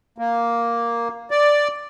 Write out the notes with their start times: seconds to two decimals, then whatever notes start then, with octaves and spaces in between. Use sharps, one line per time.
0.18 A#3
1.31 D5